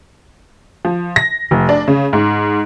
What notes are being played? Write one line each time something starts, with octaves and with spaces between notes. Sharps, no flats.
F3
A#6
F1
D4
C#3
G#2